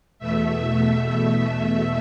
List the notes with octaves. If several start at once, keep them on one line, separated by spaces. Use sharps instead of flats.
E2 B2 A3 E5
E5